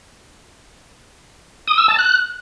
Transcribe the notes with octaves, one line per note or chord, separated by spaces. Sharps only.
D#6
E6
A5
F#6